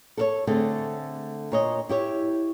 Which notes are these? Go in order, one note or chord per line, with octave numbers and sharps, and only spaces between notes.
A4 A#4 C#5
D3 A3 C4 G#4
A#2 C#5 D#5
E4 G4 C#5